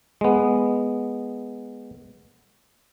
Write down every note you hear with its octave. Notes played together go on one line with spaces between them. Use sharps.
G#3 B3